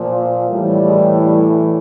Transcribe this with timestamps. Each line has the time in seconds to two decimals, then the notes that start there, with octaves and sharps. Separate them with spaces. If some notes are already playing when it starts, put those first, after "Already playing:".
Already playing: A#2 F3
0.50 A2 E3 G3
0.85 G#3
1.21 G3